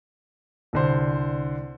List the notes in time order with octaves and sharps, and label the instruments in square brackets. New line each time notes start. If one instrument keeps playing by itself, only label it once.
[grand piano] C2 D3 C5